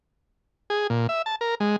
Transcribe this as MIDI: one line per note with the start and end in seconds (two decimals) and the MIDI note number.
0.70 0.87 68
0.90 1.07 46
1.09 1.22 76
1.26 1.36 81
1.41 1.55 70
1.60 1.76 56